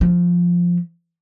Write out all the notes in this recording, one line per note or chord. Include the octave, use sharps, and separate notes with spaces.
F3